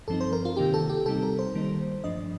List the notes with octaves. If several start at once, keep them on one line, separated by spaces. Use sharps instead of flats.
G2 F3 C4 D#4 A4
C5
A#4
F4
C3 D#3 A#3 D#4 G4
A4
G4
C3 G3 C4 D#4 A4
A#4
C5
D#3 G3 A#3 D#4
G2 F3 A3 D4 D#5